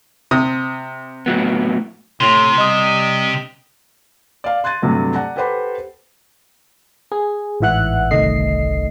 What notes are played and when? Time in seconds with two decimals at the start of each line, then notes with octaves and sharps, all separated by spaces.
0.31 C3 D#6
1.26 A2 F#3 B3
2.21 A2 C3 C6
2.58 G3 D#5 D#6
4.44 D5 F5
4.64 C6 F#6 G#6 A6 D#7
4.82 G2 C3 F#3 A3
5.14 D5 F#5 A5 A#5
5.36 G4 A4 B4 C5 F#5 B5
7.12 G#4
7.61 A1 G#2 E3 E5 F#5 F#6
8.11 G1 C2 D#3 A3 D#5 C7